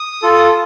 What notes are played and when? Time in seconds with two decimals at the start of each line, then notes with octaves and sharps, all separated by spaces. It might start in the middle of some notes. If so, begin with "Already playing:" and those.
Already playing: D#6
0.22 F4 A4